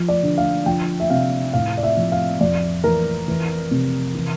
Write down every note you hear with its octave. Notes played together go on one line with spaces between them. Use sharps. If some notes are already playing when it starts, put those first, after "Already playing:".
Already playing: F3
D5
D3
F5
F3 G5
E5
C3 F5
A2 F5
D5
E5
F3
F5
F2 D5
E3 A#4
E3
C3
E3